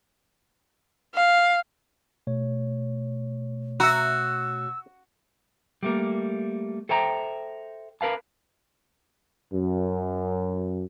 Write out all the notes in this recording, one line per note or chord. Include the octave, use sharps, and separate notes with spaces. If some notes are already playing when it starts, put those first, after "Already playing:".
F5
B2 A3 C#5
F#4 E5 A#5 E6
G3 A3 A#3
A4 C5 E5 G5 A#5
A#4 B4 F5 A5
F#2